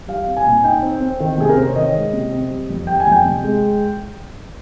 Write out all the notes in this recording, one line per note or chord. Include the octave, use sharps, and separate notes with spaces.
G3 F5
C4
G#5
A#2
D#4 G5
C4
C4
D#3
C3 G#4
A#4
C3 C5
C#5
D#3 D#5
G#3
C3
C4
G3
F2
G3 G5
G#5
F2
G5
C3
G#3